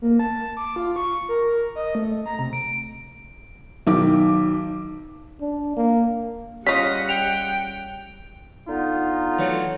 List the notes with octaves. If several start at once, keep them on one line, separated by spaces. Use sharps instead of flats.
A#3
A5
D6
F4
C#6
A#4
D#5
A3
A#5
C3
D7
B1 D#3 D6
D4
A#3
C#3 G3 F4 D#5 F#5 B6
G5 F7
D3 B3 D#4 F4
E3 F#3 A3